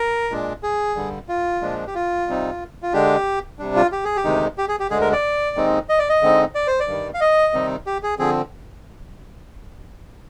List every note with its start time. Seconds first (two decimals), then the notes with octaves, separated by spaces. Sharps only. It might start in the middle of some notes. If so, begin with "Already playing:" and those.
Already playing: A#4
0.30 A#2 G#3 D4
0.63 G#4
0.96 G2 D3 G3
1.29 F4
1.61 A#2 F3 G#3 D4
1.87 G4
1.95 F4
2.28 C3 G3 C4 D#4
2.82 F4
2.93 D3 G#3 D4 G4
3.59 C3 G3 D4
3.76 F4
3.92 G4
4.04 G#4
4.17 G4
4.24 D2 C3 D#3 G#3 D#4
4.58 G4
4.68 G#4
4.80 G4
4.90 D2 D3 G#3 G#4
5.01 A#4
5.12 D5
5.56 D#2 D#3 G#3 C4 D#4
5.89 D#5
5.99 D5
6.09 D#5
6.22 D3 G#3 C4 D#4
6.55 D5
6.67 C5
6.80 D5
6.87 G2 D#3 G3
7.14 F5
7.20 D#5
7.53 C3 D#3 G3 C4 D#4
7.86 G4
8.03 G#4
8.19 D3 F3 C4 G#4